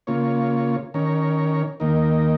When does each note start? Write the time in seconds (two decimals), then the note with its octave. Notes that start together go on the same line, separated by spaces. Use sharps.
0.07 C#3 A#3 F4 C#5
0.94 D#3 C#4 A#4 C#5
1.80 D#2 D#3 A#3 D#4 A#4